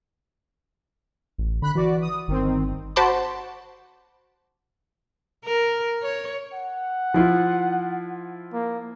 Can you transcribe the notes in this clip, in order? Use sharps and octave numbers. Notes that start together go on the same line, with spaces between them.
A1
D3 B5 F#6
E3 F#4 D5
D#6
G1 D#3 C4
F#4 C5 A5 B5 D6
A#4
C#5
F#5
F3 E4 F4
A#3